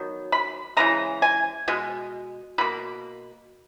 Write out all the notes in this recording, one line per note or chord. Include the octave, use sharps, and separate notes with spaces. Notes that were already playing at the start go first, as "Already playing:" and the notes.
Already playing: D#3 F#3 B3
B5
C#3 E3 G#3 A#5
G#5
B2 G#3
B2 A#3 B5